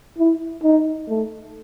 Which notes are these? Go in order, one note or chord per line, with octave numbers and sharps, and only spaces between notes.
E4
D#4
A3